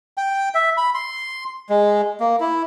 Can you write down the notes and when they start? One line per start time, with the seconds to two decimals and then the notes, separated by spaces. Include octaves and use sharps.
0.17 G5
0.55 E5
0.77 B5
0.94 C6
1.69 G#3
2.20 A#3
2.40 E4